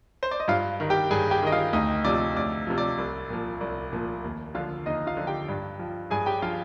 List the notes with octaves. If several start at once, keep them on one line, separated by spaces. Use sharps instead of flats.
C5
D5
D#5
G2 F4 F5
D#3
G4 G5
G2 G#4 G#5
G4 G5
D#3 D#5
F4 F5
D2 D#4 D#5
C3 F3 D5
D2 D5
C3 F3
D5
C2
A#2 F3
C2
A#2 F3
D#2
D3 F3 F4 F5
D#2 D#4 D#5
F4 F5
D3 F3
G4 G5
G2
F3
G2 G#4 G#5
G4 G5
F3 F4 F5